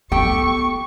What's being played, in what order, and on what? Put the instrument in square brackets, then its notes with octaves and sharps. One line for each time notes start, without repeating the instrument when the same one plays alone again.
[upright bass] B3 [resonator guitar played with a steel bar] G4 A4 G5 [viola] C#6